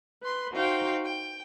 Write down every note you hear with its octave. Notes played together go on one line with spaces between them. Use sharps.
B4 C6
D#4 F#4 C5 F5 G5
G5